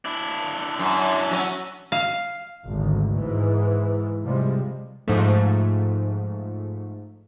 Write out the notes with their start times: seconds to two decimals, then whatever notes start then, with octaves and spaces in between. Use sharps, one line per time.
0.05 D4 E4
0.79 F#2
1.31 F#3 C#4
1.92 F5
2.67 G#1 D2
3.13 G#2 E3
4.25 C3 F3 G3 G#3
5.07 G#2 F3 A3